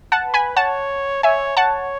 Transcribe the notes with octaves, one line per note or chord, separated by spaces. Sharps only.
F#5 A5
B4
G#5 B5
C#5 F#5 A5
C#5 E5 G#5
C#5 F#5 A5